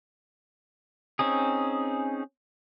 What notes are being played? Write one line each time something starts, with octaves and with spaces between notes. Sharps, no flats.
C4 C#4 D#4 G#4